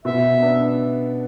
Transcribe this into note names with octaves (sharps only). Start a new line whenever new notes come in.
B2 E5
B3 D4